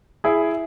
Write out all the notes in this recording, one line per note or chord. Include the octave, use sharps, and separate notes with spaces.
E4 G#4